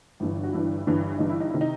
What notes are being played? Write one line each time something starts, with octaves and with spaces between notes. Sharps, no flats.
G1 G2 E3
F#4
G1 G2 E3 E4
G1 G2 E3
G1 G2 E3 D#4
E4
D#4
C3 D#3 E4
D#4